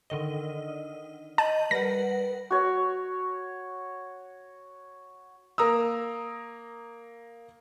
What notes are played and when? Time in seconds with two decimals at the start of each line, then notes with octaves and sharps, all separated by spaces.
0.10 D3 D#3 D#5
1.38 D#5 A5 G6 D#7 F#7
1.71 G3 A#4 B4 F#5 A#6
2.51 F#4 C#5
5.58 A#3 A#5 D#6 E6